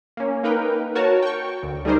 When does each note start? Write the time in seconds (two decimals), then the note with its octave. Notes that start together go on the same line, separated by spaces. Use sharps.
0.17 A#3 C#4
0.43 A#3 D#4 A#4 B4 G5
0.95 F#4 A#4 C#5 A5
1.23 G5 C#6
1.63 D2
1.85 G3 A3 D#4 G#4 A#4 C5